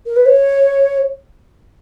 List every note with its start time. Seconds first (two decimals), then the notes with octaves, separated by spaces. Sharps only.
0.06 A#4
0.16 B4
0.25 C#5